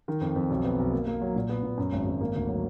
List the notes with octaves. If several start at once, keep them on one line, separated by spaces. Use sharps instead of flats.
D#3
F2
F2
B1
B3
B1
A#3
A#3
F#3
A#2
B3
A#2
F#2
G#1
G#1
A#3
D2
F#3